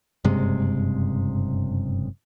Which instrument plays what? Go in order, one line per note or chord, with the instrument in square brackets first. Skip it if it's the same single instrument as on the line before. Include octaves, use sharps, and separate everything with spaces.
[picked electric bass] F#1 G2 C3 G#3